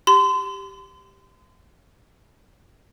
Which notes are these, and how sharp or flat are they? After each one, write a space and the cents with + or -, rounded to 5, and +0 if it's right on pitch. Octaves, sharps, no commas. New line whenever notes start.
G4 +0 C6 -35